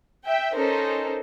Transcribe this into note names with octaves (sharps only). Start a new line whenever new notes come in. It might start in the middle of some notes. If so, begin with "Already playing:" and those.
E5 G5
C#4 D#4 A4 A#4 C5